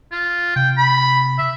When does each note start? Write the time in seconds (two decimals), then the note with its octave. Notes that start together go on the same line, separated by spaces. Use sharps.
0.12 F4
0.56 C3 G5
0.77 B5
1.38 E5